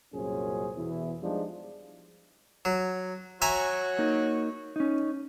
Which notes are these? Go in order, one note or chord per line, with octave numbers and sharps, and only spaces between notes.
C2 F#2 A#2 C#4 G#4 C5
E2 B2 E4
F3 G3 G#3 B3 D4 D#4
F#3
F#4 C#5 E5 G#5 A#5
A#3 D#4
C#4 D#4